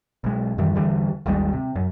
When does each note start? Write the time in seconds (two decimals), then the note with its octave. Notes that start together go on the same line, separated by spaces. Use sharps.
0.24 B1 G#3
0.58 F#2 D#3 E3 G3
0.75 E2 D3 E3 G3
1.26 G#1 D#2 G3 G#3
1.53 C3
1.76 F#2